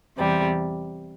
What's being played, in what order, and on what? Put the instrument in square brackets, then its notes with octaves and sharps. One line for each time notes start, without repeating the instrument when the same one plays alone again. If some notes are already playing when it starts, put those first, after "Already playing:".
[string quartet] E2 C3 G3